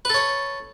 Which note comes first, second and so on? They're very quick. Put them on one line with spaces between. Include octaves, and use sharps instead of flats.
B4 A4 C#5